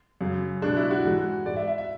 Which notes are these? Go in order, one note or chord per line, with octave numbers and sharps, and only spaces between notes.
F#2 C#3 F#3
B2 G#3 D4
E4
F#4
G#2 E3 G#3
G#2 G#3 D5
E5
E5
E5